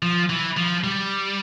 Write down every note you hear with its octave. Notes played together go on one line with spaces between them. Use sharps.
F3
E3
F3
G3